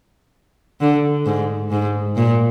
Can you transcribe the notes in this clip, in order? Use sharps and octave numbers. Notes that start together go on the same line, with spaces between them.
D3
G#2
G#2
A#2